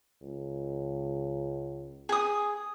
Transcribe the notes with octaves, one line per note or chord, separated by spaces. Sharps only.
C#2
G#4 D#6